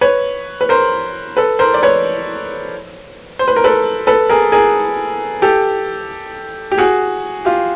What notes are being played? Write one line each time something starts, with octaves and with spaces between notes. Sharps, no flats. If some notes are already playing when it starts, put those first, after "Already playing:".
B4 C#5
B4
A#4 C5
A4 B4
A#4 C5
D5
B4 C#5
C5
B4
A#4
A4 B4
A4 B4
G#4 A#4
G#4 A#4
G4 A4
G4
F#4 G#4
F4 G4